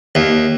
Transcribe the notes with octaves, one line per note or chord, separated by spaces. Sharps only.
D#2